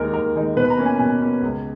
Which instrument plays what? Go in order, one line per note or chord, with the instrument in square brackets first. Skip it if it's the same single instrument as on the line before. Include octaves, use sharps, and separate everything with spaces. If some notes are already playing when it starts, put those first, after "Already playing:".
Already playing: [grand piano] D#2 D#3 G#3 D#4 A#4
D#2 A#4
D#3 G#3 D#4
B2 B4
B5
A#5
A#3 C#4
G#5
B2 G#5
A#3 C#4
C#2